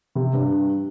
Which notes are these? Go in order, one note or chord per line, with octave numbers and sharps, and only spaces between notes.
C3
G2